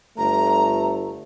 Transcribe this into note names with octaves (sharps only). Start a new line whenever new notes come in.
G1 A3 A#5